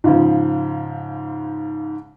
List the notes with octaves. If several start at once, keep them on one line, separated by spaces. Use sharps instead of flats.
G#2 C#3 F3